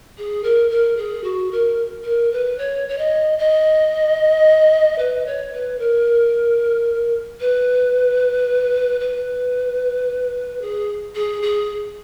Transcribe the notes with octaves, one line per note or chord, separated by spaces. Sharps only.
G#4
A#4
A#4
G#4
F#4
A#4
A#4
B4
C#5
C#5
D#5
D#5
B4
C#5
B4
A#4
B4
B4
G#4
G#4
G#4